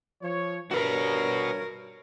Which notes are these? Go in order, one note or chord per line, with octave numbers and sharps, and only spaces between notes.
F3 C#5
G2 F#4 A#4 B4 C#5